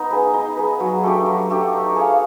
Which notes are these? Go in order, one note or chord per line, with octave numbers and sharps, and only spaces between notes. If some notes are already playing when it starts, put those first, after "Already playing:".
Already playing: B3 D#4
G#4 B4
D#4
G#4 B4
F#3
A3 D4 G4
F#3
A3 D4 G4
D#4
G#4 C#5 F5